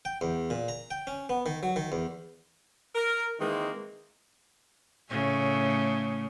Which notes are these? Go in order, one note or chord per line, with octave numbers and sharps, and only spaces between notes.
G5
E2
A#2
A#5
G5
C#4
B3
D#3
F#3
D#3
E2
A#4
D#3 E3 G#3 A#3 C4
A2 C#3 A3